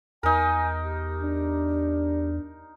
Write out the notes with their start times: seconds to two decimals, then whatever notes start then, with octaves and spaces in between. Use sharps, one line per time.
0.23 E2 D#4 A#4 G#5
0.82 G4
1.22 D4